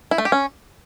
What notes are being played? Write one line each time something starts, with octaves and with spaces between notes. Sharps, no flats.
E4
A3
G4
C#4